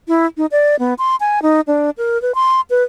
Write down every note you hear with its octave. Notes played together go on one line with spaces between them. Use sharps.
E4
D#4
D5
B3
C6
G#5
D#4
D4
A#4
B4
C6
B4